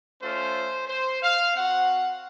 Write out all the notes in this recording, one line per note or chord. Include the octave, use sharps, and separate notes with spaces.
A3 C#4 F4 C5
C5
F5
C4 F#4 F#5